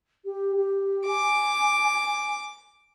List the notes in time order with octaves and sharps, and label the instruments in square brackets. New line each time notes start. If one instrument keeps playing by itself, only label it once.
[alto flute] G4
G4
[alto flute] G#5 [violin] D6